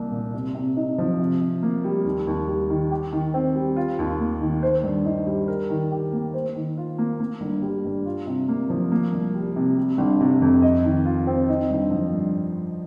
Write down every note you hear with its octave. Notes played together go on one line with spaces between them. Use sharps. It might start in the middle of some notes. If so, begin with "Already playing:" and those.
Already playing: C2 A#3
A#2
C3
C3
D#4
F3
C3
C3
A#3
G3
D#2
D#2
G3
D#3
G4
D#3
C4
G3
F4
D#2
A#3
D#3
C5
G2
D#4
G3
A#4
D#3
G4
A#3
C5
D#3
F4
A#3
A#3
G1
G3
G2
F4
C3
A#3
F3
A#3
C2
G3
C3
G3
G1
C3
F2
D#5
D#3
F4
C4
D#4
G1
F3
G2